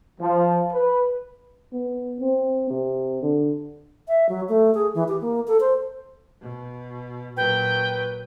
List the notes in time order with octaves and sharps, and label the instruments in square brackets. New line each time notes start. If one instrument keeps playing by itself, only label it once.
[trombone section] F3
B4
[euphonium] B3
C4
C3
D3
[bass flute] E5
F#3
A3
G#4
E3
G4
A#3
A4
C5
[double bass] B2
[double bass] A#2 F#3 [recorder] B4 [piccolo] G5